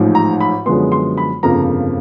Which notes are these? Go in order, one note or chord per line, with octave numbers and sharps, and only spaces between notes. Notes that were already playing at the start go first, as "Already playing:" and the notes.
Already playing: A1 G#2 F3
A#5
B5
F#2 D3 F3 G#3 B3 C6
C6
B5
G1 F2 C#3 F3 A#3 A#5